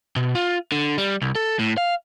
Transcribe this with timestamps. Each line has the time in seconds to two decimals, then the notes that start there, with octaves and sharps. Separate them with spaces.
0.16 B2
0.35 F4
0.72 D3
0.98 G3
1.22 C2
1.35 A4
1.59 A2
1.78 F5